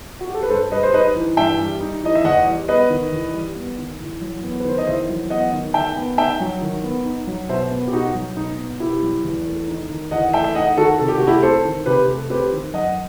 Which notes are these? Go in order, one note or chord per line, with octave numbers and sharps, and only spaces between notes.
F#4
G4
A4
B4
G2 A4 C5
G3 B4 D#5
C5
D#4 B4 D#5
E3
G2 E5 G5
G3
D#4
E3 D#5
E5
E2 D#5 F#5
G3
B3 B4 D#5
D#3
E2
G3
B3
D#3
E2
F#3
B3
B4
D#3 C5
D#5
E2 C5 E5
F#3
B3 D#5 F#5
D#3
D#3 E5 G5
B3
D#4 E5 G5
F#3
D#3
B3
D#4
F#3
B2 C5 E5
B3
G4
B2 D#4 F#4
F#3
B2 D#4
B3
B2 E4 G4
F#3
E2
A3
D#4
D#3
E2 D#5 F#5
A3 E5 G5
E5
D#4 D#5 F#5
D#3 F#4 A4
C3 A4
G4
A3 F#4
E4 G4
C4 A4 C5
D#3
C3 G4 B4
A3
C4 G4 B4
D#3
F#2 D#5 F#5